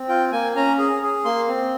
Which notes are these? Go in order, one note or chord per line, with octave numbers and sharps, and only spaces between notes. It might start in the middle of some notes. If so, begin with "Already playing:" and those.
Already playing: C4
F4 G5
A#3 G#5
C#4 A#5
G#4
G#4
A#3 C6
C4